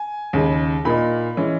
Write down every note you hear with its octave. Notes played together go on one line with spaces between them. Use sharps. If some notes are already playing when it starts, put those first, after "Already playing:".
Already playing: G#5
D#2 C#3 G#3
A#2 A#3 D#4 B5
E3 G#3 C#4